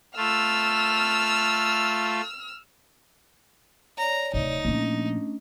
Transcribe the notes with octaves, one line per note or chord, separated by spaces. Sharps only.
A3 F4 E6 F6
C#5 D5 A#5
D1 C3 D#4
A#2 F3 A3 C#4 D4